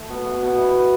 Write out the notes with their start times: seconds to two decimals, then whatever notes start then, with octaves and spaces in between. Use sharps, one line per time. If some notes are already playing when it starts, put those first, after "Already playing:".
Already playing: A3
0.10 B2
0.26 A3
0.42 B2
0.58 E4
0.74 B4